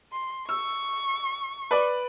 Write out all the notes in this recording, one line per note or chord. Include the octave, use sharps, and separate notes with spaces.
C6
C#6 E6
B4 D5